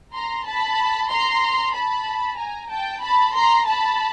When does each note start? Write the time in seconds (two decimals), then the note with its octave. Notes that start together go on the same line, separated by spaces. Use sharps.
0.14 A#5 C6
0.46 A5 B5
1.10 A#5 C6
1.75 A5 B5
2.38 G#5 A#5
2.70 G5 A5
3.02 A5 B5
3.35 A#5 C6
3.67 A5 B5